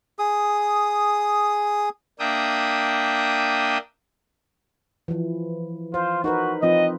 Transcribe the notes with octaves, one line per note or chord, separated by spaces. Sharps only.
G#4 D#6
A#3 D4 E5 G5 D#6
E3 F3
F4 C5
D#4 F#4 A#4 B4
F3 C4 F4 D#5